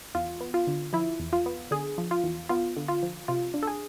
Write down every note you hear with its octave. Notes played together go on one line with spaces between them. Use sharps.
E2 F4
B3
F4
D3
F3 E4
E2
F4
B3
D3 G#4
F3
F4
E2
B3 F4
D3
F4
F3
C3 F4
D4
A4
G#4